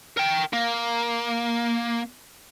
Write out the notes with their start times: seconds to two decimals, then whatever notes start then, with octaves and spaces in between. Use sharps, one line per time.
0.17 A#4 G5
0.53 A#3